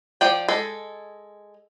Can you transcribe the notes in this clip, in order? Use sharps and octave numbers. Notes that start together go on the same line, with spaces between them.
F3 D5 G5
G#3 A4